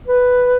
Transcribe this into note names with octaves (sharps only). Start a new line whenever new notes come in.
B4